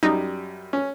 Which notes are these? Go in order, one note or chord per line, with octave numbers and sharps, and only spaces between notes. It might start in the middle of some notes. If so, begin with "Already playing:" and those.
F#2 G3 D#4
C#4